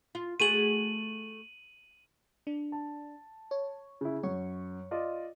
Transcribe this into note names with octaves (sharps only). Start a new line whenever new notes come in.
F4
A3 F#4 G#4 D#7 F#7
D4
A5
C#5
C#3 E4
F#2 C#5 C#6
F4 D5 D#5